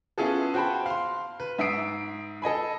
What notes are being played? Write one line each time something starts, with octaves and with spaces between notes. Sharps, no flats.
B3 C#4 E4 F4 G#4 A4
F#4 C5 G5 A5 B5
F5 C6
B4
G#2 E5 D#6 C7 D7
A4 D#5 G#5 B5